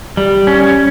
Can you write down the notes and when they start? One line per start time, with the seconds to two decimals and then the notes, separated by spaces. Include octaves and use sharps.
0.17 G3
0.47 C#4